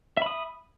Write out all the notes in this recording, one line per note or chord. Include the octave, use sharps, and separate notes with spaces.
E5 B5 D#6